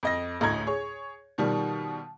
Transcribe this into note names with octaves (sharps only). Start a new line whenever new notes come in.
F2 D#5 A#6
A1 D2 A2 D#5 A#5 G#6
G#4 C#5
B2 D#3 F3 G3